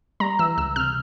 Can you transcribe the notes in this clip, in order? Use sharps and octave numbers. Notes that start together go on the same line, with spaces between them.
G3 A#5
E3 E6
C#2 E6
C3 F6